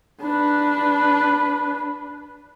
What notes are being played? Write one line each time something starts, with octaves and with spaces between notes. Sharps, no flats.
D4 B4